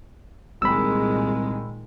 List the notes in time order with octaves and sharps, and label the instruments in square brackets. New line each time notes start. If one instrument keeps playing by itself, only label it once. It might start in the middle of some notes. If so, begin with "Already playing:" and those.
[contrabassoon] C2 [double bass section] A#2 D#3 G#3 [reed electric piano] B5 E6